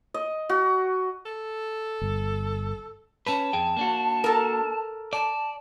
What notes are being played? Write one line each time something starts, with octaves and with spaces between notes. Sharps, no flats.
D#5
F#4
A4
G1
C#4 B4 A5
F2 G#4 G5
A#3 D4 F#4
A4 A#4
D5 A5